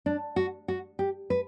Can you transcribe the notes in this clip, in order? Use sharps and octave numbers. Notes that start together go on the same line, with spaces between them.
D4
F#4
F#4
G4
B4